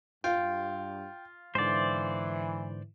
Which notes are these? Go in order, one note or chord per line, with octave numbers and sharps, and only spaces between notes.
G2 F4 G5
G#2 D3 E3 C5 D5